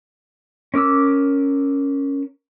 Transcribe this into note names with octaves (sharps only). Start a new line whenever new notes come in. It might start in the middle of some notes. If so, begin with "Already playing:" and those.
C#4 A#4 D6 E6